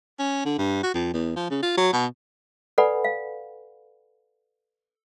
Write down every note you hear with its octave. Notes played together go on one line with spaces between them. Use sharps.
C#4
D3
G2
F#4
F2
E2
F3
C#3
F4
F#3
B2
A4 B4 D5 F#5 G#5 B5
F5